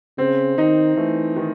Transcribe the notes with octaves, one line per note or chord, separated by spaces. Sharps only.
C#3 C4
D#3 D#4
E3 A3
D#3